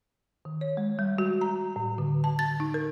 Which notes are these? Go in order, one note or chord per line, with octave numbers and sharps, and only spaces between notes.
D#3
C#5
G#3
G3
F#4
A#5
A2
D3
A5
A6
D#4
A#4